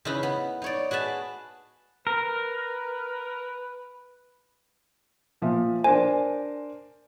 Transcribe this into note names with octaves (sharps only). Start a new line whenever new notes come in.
C#3 D#4 E4 B4
B3
D#4 C#5 D5
F#4 G#4 B4 A5
A#4 B4
A#2 F3 E5
D4 A#4 C5 G#5